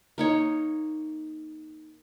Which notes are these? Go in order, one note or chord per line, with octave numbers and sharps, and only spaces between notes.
A#3 D#4 C#5